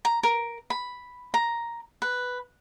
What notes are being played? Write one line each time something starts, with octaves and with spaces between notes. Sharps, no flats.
A#5
A#4
B5
A#5
B4